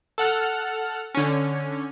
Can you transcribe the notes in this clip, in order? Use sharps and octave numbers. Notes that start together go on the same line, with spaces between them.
A4 F#5 F6
D3 C#4